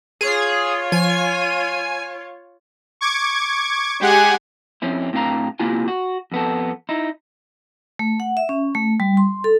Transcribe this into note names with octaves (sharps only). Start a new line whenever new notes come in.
F4 G#4 C#5
F3 G#5
C#6 D6 G#6
G#3 G4 F#5 G#5
F2 C4 C#4 E4
A2 C4 D4 F5 A#5
C3 A#3 E4 F4 G#5
F#4
F2 B3 A4
D#4 E4
A3
F#5
E5
C#4
A3
G3
C6
A4